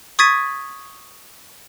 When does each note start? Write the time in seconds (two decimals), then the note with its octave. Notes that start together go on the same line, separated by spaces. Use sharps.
0.19 C#6 D#6 G#6 A6 B6 D#7